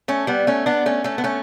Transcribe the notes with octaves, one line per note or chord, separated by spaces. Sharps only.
A3 C#4
G3 B3
A3 C#4
B3 D4
A3 C#4
A3 C#4
B3
A3 C#4